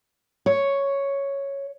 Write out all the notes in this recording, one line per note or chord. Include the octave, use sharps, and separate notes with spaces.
C#5